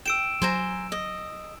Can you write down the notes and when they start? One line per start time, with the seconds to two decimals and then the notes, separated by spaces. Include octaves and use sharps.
0.06 G5 E6 D7 E7
0.42 F#3 C5 G#5 A#5
0.92 D#5